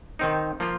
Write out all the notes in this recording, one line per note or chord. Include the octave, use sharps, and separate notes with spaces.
D#3 C4 D#4
F3 A#3 F4